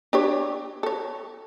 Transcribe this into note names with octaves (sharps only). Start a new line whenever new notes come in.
D4 G4 C#5
A4 C#5